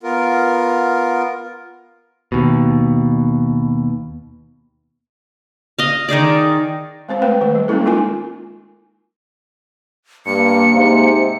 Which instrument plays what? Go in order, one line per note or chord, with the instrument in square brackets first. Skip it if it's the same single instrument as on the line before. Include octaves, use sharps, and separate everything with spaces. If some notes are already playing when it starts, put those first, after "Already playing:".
[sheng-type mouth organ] B3 F4 A#4
[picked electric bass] D#2 B2
[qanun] D#5 F5
D#3 D#4 G#4 D5
[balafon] G#3 C4 C5 F5
A3 C4 B4 F5 G5
D#3 A3 B4
G3
G#3 A#3 C4 C#4 E4 A4
D#4 F4 A#4 G#5
[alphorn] G2 [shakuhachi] A#3 [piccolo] C#7
[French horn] G#2 [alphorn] C3